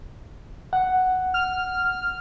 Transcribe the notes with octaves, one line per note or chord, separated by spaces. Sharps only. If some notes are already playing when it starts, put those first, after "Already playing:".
F#5
F6